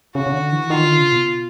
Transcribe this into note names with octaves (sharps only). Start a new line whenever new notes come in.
C#3 F#4
C#3
D3
E3
D#3 F4
D3
C#3
B2